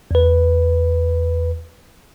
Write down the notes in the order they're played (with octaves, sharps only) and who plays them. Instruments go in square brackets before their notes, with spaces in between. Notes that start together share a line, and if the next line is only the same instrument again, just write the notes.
[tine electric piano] E2 B4